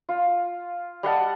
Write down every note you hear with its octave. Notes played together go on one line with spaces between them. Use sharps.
F4
G3 D#5 F#5 A5